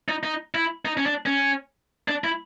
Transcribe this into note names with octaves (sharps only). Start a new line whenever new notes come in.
D#4
D#4
E4
D#4
C#4
D4
C#4
D4
E4